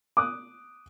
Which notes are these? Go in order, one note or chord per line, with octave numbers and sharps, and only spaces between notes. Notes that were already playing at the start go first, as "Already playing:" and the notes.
D6 D#6 F#6